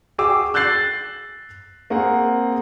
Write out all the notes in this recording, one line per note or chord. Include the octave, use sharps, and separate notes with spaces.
F#4 G#4 G5 D6 E6
E6 F#6 G6 A6 C7 F#7
A#3 C4 G#4 F#5